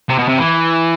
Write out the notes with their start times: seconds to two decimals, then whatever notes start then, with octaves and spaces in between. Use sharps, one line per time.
0.09 C3
0.19 B2
0.29 C3
0.38 E3